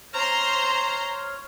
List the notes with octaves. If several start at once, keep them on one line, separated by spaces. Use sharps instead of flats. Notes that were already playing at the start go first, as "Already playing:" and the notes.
C5 C#5 A#5 C6 F6